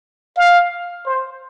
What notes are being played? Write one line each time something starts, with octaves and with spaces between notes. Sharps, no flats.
F5
C5